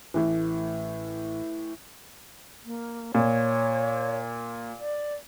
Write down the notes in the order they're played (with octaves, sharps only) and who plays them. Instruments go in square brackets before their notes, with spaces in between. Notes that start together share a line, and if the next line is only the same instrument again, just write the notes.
[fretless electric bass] A1 [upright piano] A2 E3
[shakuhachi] A#3
[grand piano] A#2 [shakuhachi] C#5
[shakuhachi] D5